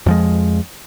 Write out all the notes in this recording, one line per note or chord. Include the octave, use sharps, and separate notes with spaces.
F2 F3 G#3